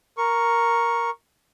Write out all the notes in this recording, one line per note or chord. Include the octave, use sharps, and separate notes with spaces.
A#4 C#6